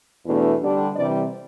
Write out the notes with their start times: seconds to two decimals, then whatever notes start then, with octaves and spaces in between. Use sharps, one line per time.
0.25 E2 B2 A3 D4
0.61 D3 G3 D4
0.95 C3 E3 G3 D5